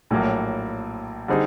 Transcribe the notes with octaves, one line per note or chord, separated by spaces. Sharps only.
A#1 A2 F#3 A#3
D3 G3 C4 D#4 G#4